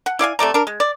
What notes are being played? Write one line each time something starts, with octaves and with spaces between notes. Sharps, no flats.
F#5
E4 D5 F5 G#5
C3 A3 D5 A#5
D4 A#4
G#3
D5